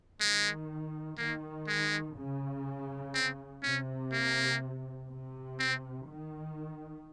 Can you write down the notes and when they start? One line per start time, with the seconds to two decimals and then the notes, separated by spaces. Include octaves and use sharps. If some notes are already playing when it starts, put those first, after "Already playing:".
0.20 D#3 G#3
1.18 D#3 A#3
1.67 G#3
2.16 C#3
3.14 C4
3.63 C3 C#4
4.12 A#3
5.10 C3
5.59 C4
6.08 D#3